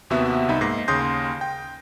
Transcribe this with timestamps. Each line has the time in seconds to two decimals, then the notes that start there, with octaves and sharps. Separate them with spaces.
0.10 D#2 C3 B3 F#4 E5
0.48 C2 D#4 E5 B5
0.61 G#2 A#3 A#6 C7
0.88 D#2 C#3 C6 D#6 G6 A#6
1.41 G5